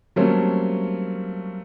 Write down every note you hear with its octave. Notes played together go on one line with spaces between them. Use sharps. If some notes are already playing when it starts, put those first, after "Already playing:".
F#3 G3 A3 A#3 C4 C#4